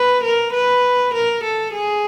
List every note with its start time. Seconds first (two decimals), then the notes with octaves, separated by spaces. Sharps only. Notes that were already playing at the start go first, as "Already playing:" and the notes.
Already playing: B4
0.23 A#4
0.53 B4
1.14 A#4
1.44 A4
1.73 G#4